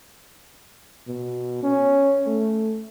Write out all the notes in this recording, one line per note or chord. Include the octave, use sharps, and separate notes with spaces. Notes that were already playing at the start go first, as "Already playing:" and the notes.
B2
C#4
A3